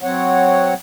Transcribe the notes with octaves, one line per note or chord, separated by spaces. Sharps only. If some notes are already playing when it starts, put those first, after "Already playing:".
F#3 C4 C#5 F#5